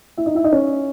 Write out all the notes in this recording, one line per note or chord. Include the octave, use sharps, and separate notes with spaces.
E4 E5
D#4 D#5
E4 E5
D#4 D#5
C#4 C#5